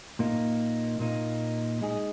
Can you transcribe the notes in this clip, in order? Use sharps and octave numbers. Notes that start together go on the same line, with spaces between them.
A#2 A#3 D#4
A#2 A#3 D#4
G#3 D#4 G#4